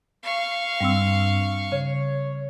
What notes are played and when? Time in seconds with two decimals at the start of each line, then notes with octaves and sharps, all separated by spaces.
0.23 F5 C#6
0.80 G2 G3 C4 E6
1.72 C#3 C#5